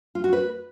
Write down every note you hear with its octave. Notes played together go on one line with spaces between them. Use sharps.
F4
F#4
B4